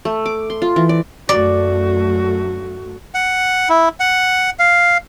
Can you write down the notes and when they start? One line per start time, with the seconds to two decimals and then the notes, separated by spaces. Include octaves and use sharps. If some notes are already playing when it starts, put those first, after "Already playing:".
0.05 A3
0.26 D6
0.50 C6
0.62 F4
0.76 E3
0.89 D5
1.29 F#2 A3 F#4 D5
3.14 F#5
3.69 E4
4.00 F#5
4.59 F5